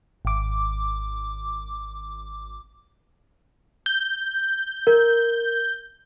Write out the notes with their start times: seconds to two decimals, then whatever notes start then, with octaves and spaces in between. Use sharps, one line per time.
0.25 G#1 D6
3.86 G6
4.87 A#4